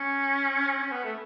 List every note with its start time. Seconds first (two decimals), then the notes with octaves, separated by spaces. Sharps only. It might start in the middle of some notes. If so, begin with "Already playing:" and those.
Already playing: C#4
0.79 C#4
0.91 B3
1.04 A3